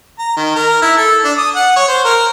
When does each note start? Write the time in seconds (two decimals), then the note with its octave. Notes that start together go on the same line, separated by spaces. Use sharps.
0.19 A#5
0.37 D#3
0.56 A#4
0.82 E4
0.97 A4
1.24 D4
1.38 D#6
1.55 F#5
1.76 C#5
1.88 C5
2.05 A#4